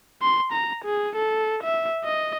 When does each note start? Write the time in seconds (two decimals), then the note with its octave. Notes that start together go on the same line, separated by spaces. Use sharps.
0.22 C6
0.52 A#5
0.85 G#4
1.16 A4
1.63 E5
2.04 D#5